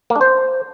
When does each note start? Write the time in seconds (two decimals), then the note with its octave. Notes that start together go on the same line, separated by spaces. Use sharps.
0.10 A#3
0.16 D4
0.21 C5